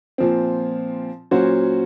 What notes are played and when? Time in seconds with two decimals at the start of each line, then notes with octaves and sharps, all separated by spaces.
0.18 A#2 F3 C4
1.31 A#2 F#3 C#4 F#4 C5